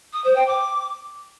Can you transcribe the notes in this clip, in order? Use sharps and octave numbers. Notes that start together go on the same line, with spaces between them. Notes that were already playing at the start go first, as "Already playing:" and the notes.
D#6
C5
G5
D6